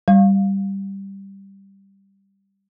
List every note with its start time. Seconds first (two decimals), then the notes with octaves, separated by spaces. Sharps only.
0.08 G3 F5